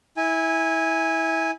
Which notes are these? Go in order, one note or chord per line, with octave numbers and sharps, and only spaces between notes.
E4 G#5